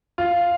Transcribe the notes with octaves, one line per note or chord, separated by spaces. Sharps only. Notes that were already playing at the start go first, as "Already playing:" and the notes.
F4